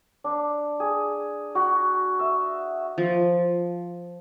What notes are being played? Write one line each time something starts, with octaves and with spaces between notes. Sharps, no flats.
D4
G#4
F#4
E5
F3